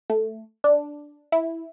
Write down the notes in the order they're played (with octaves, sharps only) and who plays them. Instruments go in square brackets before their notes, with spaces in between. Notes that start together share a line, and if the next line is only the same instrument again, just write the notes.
[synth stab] A3
D4
E4